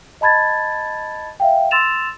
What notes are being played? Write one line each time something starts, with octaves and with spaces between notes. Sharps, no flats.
D#5 A5 B5 G#6 A6
E5 F5 G5
C6 E6 A6 E7 F7